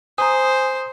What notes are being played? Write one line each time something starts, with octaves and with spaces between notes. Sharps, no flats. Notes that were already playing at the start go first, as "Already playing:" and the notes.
C5 G#5 A#5 D#6